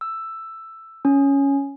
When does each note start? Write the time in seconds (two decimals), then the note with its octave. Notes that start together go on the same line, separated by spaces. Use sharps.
0.01 E6
1.05 C#4